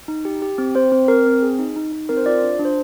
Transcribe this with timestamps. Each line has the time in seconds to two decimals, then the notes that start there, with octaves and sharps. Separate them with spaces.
0.08 D#4
0.25 G4
0.42 G4
0.58 C4
0.75 C4 C5
0.92 C4
1.08 C4 A#4
1.26 C4
1.43 G#4
1.59 D#4
1.76 D#4
1.92 D#4
2.09 C4 A#4
2.17 C5
2.26 F4 D5
2.43 D4
2.60 D4
2.65 C5